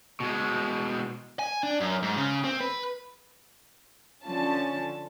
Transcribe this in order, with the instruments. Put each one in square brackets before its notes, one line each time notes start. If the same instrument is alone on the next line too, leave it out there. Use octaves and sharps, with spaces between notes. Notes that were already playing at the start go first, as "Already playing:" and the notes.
[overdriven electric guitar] B2 G#3
[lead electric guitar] G#5
D4
F#2
G#2
C#3
C4
B4
[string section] D3 F3 C#4 A5